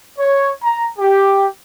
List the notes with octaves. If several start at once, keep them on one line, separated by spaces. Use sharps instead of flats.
C#5
A#5
G4